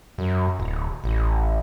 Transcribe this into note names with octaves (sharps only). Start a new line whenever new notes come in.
F#2
D1
A1